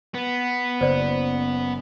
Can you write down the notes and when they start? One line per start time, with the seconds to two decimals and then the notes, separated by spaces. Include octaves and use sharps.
0.15 B3
0.81 F#1 C5 D5